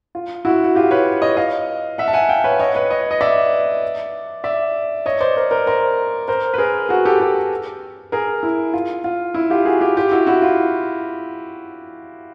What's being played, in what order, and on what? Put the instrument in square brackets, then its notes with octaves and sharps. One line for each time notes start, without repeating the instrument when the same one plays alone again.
[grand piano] F4
E4 F#4
F#4
F4 G4
B4 C#5
C#5 D#5
D#5 F5
E5 F#5
A5
F#5 G#5
F5 G5
B4 C#5
C#5 D#5
B4 C#5
C#5 D#5
D#5
D5 E5
D5 E5
C#5 D#5
C5 D5
A#4 C5
A#4 C5
A#4 C5
A#4 C5
B4
G#4 A#4
F#4 G#4
G4 A4
G4 A4
G#4 A#4
E4
F4
F4
E4
F4 G4
F#4 G#4
F4 G4
F4 G4
E4 F#4
E4 F#4
F4